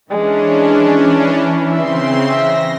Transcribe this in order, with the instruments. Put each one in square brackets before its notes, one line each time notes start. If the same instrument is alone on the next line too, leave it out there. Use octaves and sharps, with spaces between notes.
[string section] E3 [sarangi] G#3 [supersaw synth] C#4 D4
[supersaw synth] C#3 C4 C6 [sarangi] E5
[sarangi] E5 [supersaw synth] A#6